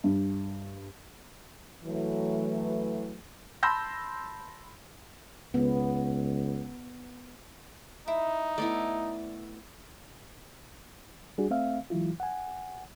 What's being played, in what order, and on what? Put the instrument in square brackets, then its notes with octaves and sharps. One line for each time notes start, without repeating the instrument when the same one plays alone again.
[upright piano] G2
[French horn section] E3 F#3 A3
[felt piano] A5 B5 C6 E6 G6 A#6
[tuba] C#2 [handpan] B3
[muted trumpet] D#4 [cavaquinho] E4
[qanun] A3 B3 E4 [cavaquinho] D5
[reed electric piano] G3 D4 F#4 G#4
A3 C4 E5 F5
E3 F#3 G#3 E4 F4
F#5 G#5